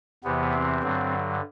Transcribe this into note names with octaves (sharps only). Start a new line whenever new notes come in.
E2 C3 E3 B3
C4
G2 D3 F#3